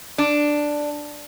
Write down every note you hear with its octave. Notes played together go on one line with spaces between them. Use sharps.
D4